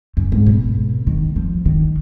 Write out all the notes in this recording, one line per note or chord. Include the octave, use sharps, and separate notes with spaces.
F#2
G#2
B2
D#3
F3
D#3